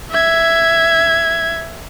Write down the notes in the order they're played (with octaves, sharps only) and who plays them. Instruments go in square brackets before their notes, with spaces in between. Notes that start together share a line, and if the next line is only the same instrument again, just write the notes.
[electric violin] E5 G#6